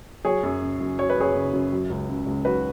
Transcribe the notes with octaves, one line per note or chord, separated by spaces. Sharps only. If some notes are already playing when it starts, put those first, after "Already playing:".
F#3 G#4 C#5
F#2
C#3
F#2
F#3 C#5
B4
F#2 G#4 C#5
C#3
F#2
F#3
C#2
C#3
C#2
F#3 F#4 B4